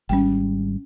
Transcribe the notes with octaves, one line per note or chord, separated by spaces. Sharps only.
G#1 G3 C#4 G5